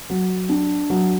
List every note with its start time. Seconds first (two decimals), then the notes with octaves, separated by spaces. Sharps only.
0.10 F#3
0.49 D4
0.90 F#3